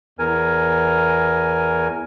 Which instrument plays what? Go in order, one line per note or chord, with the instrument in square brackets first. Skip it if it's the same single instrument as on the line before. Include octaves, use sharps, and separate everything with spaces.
[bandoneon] E2 A#4 G#5